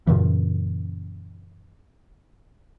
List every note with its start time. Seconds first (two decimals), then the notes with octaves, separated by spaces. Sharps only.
0.07 F#2 A#2 C#3 E3